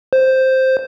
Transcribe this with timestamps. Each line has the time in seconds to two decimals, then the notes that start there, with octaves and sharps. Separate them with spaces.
0.13 C5